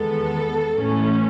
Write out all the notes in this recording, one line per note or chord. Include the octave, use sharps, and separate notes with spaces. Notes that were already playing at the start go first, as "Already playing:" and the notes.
Already playing: E2 D#3 G#3 B3 A4
A2 E3 A3 C#4